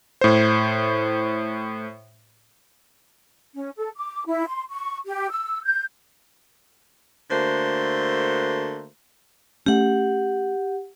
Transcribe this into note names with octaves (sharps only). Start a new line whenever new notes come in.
A2 C5
C#4
A4
D6
E4
C6
C#6
G4
E6
G6
D3 A3 A#3 F#4 C5
A3 C#4 G4 F#5